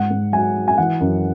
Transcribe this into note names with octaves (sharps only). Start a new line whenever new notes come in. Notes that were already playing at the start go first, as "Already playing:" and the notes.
Already playing: G#2 F#5
G#2
F#3 G#5
F#3
G#5
E3 F#5
F#2